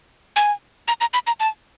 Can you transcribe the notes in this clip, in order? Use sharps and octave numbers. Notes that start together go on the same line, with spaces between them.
G#5
A#5
A#5
B5
A#5
A5